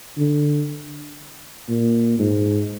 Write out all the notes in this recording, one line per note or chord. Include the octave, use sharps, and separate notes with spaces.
D3
A#2
G#2